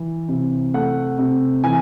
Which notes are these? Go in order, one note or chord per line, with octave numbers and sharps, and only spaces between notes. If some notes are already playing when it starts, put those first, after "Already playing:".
Already playing: E3
C3
A3 F#5
C3
E3 G#5